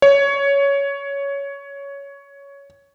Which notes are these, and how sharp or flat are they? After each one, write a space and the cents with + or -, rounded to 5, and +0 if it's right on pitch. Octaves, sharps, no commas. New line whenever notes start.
C#5 +10